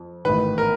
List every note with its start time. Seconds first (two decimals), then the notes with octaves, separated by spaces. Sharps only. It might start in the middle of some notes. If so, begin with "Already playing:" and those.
Already playing: F2
0.25 A1 G#2 D#3 B4
0.58 A#4